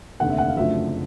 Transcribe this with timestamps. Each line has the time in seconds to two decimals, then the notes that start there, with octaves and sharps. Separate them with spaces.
0.20 F1 D#2 D3 F#5
0.30 E5
0.38 F#5
0.48 F5
0.57 F#1 F#2 D3 F3 A3 E5